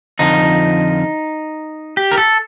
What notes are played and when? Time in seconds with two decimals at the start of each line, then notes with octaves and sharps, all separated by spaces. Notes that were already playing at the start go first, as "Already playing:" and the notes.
0.19 F2 D3 F3 D#4
1.97 G4
2.12 A#4
2.18 A4